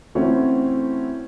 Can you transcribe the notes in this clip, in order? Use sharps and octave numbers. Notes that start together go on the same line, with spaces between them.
E3 A3 C4 C#4 E4 F#4